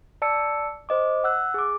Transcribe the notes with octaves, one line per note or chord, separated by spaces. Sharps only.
D5 A5 E6 C#7
C5 D#5 D6
F#5 E6 F#6
G#4 D6